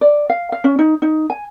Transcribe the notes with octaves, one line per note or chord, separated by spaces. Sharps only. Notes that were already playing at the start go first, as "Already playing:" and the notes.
D5
F5
F5
C#4
D#4
D#4
G#5